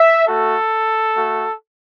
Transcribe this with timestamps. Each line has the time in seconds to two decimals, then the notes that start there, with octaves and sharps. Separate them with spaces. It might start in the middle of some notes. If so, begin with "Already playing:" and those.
Already playing: E5
0.26 A3 F#4 A4
1.15 A3 F#4